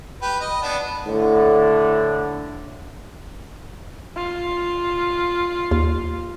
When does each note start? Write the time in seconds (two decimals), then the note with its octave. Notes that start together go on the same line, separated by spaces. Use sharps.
0.22 G4 B4
0.40 D#5
0.62 B3 D4
1.07 A2 D3
4.16 F4
5.71 D#2